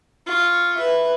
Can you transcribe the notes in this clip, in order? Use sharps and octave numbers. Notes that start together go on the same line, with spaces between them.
F4 C#6
B4 E5